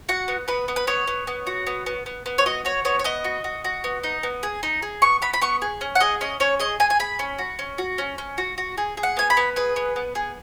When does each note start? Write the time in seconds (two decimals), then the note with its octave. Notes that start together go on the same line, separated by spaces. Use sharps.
0.09 F#4 F#5
0.28 B3
0.48 B3 B4
0.68 B3
0.76 B4
0.87 B3 C#5
1.07 B3
1.27 B3
1.47 F#4
1.67 B3
1.86 B3
2.06 B3
2.26 B3
2.38 C#5
2.46 F#4 D#5
2.65 F#4 C#5
2.85 B3 C#5
2.99 C#5
3.04 B3 D#5
3.24 F#4
3.44 F#4
3.64 F#4
3.84 B3
4.04 D#4
4.23 B3
4.43 G#4
4.63 D#4
4.82 G#4
5.02 B3 C#6
5.22 B3 B5
5.33 B5
5.42 B3 C#6
5.62 G#4
5.81 C#4
5.95 F#5
6.00 G#4 D#5
6.21 C#4 D#5
6.40 C#4 C#5
6.60 G#4 D#5
6.80 G#4 G#5
6.90 G#5
7.00 G#4 B5
7.19 C#4
7.39 F#4
7.59 C#4
7.78 F#4
7.98 C#4
8.18 C#4
8.38 F#4
8.58 F#4
8.78 G#4
8.97 G#4
9.03 F#5
9.17 B3 G#5
9.30 B5
9.37 B3
9.56 G#4 B4
9.76 B3
9.96 B3
10.15 G#4